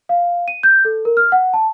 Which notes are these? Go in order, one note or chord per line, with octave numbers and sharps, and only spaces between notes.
F5
D#7
G6
A4
A#4
F6
F#5
A5